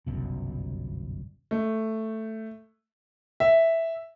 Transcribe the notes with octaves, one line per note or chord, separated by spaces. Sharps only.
G1 C2 F#2 B2
A3
E5